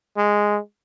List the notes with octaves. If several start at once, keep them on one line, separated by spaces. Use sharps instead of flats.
G#3